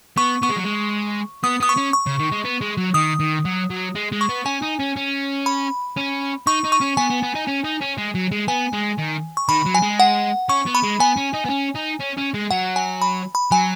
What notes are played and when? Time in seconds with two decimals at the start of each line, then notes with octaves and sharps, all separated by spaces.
0.17 B3 C#6
0.43 B3 C#6
0.50 G#3
0.57 F#3
0.65 G#3
1.44 B3 D#6
1.60 B3 D#6
1.69 C#6
1.77 C#4
1.93 C#6
2.06 C#3
2.19 D#3
2.32 G#3
2.44 B3
2.61 G#3
2.77 F#3
2.94 D#3 D#6
3.20 D#3
3.45 F#3
3.70 F#3
3.95 G#3
4.12 G#3
4.21 C#6
4.29 B3
4.45 C#4 G#5
4.62 D#4
4.79 C#4
4.96 C#4
5.46 B5
5.97 C#4
6.47 D#4 C#6
6.64 D#4
6.72 C#6
6.80 C#4
6.97 B3 G#5
7.10 B3
7.23 B3
7.35 D#4
7.48 C#4
7.64 D#4
7.81 C#4
7.98 G#3
8.15 F#3
8.32 G#3
8.48 B3 G#5
8.73 G#3
8.98 D#3
9.37 C#6
9.49 D#3 B5
9.66 F#3
9.75 G#5
9.82 G#3
10.00 F#5
10.49 C#4 C#6
10.66 B3
10.75 B5
10.83 G#3
10.99 B3 G#5
11.17 C#4
11.34 D#4
11.45 B3
11.50 C#4
11.75 D#4
12.00 C#4
12.17 C#4
12.34 G#3
12.51 F#3 F#5
12.76 G#5
13.02 B5
13.35 B5
13.51 F#3 G#5